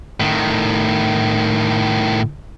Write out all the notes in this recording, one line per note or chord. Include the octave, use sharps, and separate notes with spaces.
A2 D#3